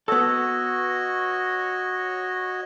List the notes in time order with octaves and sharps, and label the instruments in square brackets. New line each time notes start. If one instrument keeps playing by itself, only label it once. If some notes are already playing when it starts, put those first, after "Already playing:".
[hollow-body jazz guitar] B3 A4 [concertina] F#4 C#5 D#5 [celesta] E6